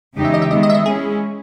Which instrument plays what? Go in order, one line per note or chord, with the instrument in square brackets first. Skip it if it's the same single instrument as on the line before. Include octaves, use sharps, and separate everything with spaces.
[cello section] E2 C#3 G#3 D#4 G4
[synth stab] E5
D#5
E5
[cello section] D#3 G#3 B3 [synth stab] D#5
[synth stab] D#5
E5
D#5
[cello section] G#3 C#4 E4 [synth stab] G#4